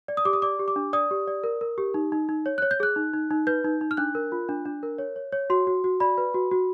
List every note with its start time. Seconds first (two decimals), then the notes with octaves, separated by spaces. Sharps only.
0.08 D5
0.17 D#6
0.25 G4 D6
0.33 D#6
0.42 D5 D6
0.59 G4
0.68 D6
0.76 D4
0.93 D5 D#6
1.11 G4
1.27 D5
1.44 A#4
1.61 A#4
1.78 G4
1.94 D#4
2.12 D#4
2.29 D#4
2.46 C#5
2.58 C#5 F#6
2.71 G6
2.80 G#4 F#6
2.96 D#4
3.14 D#4
3.31 D#4
3.47 B4 G6
3.64 D#4
3.81 D#4
3.91 F6
3.97 D4 F#6
4.15 A#4
4.32 F4
4.49 D4
4.65 D4
4.83 A#4
4.98 C#5
5.16 C#5
5.32 C#5
5.50 F#4 C6
5.67 F#4
5.84 F#4
6.00 D5 B5
6.18 B4
6.34 F#4
6.51 F#4